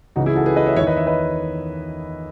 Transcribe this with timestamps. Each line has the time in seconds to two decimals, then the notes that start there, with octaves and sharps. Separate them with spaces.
0.16 C#2 C#3 E3 D#4 F#4
0.26 E4 G#4
0.36 F#4 A4
0.46 G#4 B4
0.56 B4 D#5
0.66 C#5 E5
0.76 E2 C#5 E5
0.81 D#3
0.87 B4 D#5
0.96 C#5 E5
1.07 B4 D#5